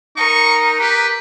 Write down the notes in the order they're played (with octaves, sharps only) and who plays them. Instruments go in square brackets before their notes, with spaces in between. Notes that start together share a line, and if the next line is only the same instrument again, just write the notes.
[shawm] D#4 [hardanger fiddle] A#4 [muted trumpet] C#6
[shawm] G4 [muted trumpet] B4